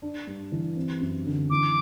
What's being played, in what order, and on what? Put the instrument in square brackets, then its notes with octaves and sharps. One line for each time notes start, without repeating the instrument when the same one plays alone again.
[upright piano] D4
G2
E3
C4
F#2
D3
[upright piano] E3 [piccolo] D6